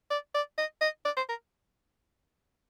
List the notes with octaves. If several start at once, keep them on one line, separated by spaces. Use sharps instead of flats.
D5
D5
D#5
D#5
D5
C5
A#4